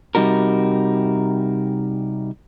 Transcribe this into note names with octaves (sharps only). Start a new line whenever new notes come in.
C3 G3 D#4 F#4 A#4